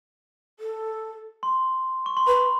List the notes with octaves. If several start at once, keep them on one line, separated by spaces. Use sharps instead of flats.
A4
C6
C#6
C6
B4 B5